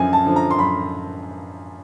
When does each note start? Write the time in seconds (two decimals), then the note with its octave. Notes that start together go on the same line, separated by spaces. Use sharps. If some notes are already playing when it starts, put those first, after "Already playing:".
Already playing: F#2 D3 F3 G#5
0.13 A5
0.25 D3 F3
0.36 A#5
0.51 C6
0.58 F#2 B5